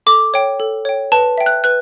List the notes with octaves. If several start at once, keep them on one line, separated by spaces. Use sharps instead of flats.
A4 D6
C#5 G5
A4
C#5 G5
B4 A5
E5 G5
F#6
B4 F#6